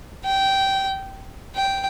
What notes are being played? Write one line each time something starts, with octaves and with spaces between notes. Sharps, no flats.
G5
G5